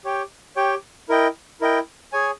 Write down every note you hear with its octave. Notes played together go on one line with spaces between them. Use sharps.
G4 C#5 G5
G4 C#5 G5
E4 A#4 D#5 G5
E4 A#4 D#5 G5
G#4 C#5 G#5